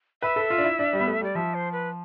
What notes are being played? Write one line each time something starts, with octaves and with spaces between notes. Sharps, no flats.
B4 E5
A4
F4
D4
E4
D4
G3
B3
A3
G3 D5
F3 E5
C5
B4